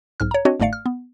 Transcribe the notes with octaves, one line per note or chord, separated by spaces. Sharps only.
B1 G#2 F6
C#5 A#5
C4 D4 F#4 C#5 D#5
G1 G#2 A3 D5 F5 C#7
F6
B3